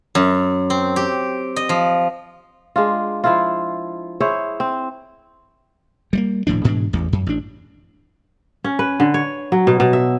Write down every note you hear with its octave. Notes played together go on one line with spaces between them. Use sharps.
F#2
C4
G4
D#5
F3
G#3 D4 F4
F3 E4 F4
E4 G#4 C5 C#5
C4
G3 G#3 A#3
D#1 A2 F3 D4
G#2 B2 E3 D4
A1 E2
F#2
A1 D4
C#4
B4
D3
C#5
F#3
B2
B2
E5